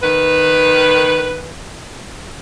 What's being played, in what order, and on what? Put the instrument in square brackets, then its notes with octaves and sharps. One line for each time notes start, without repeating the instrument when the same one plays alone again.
[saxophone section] D#3 B4